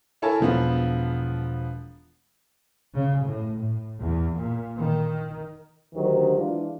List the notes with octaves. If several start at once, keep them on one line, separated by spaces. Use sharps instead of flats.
E4 A4 A#4 C#5 G#5 A5
E1 F3 B3
C#3
A2
A2
E2
A#2
D#3
D2 D3 D#3 F#3 G4 C5
E3 G#3 D4 F4